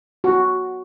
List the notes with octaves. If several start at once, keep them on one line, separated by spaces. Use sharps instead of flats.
F#4